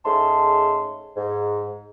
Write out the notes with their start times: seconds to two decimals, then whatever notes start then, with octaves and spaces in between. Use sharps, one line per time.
0.05 G#2 A3 C#4 G#4 A5 C6
1.16 G#2